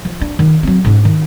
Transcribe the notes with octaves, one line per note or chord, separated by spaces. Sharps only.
F3
D4
D#3
F#3 C4
G#2 C#4
D#3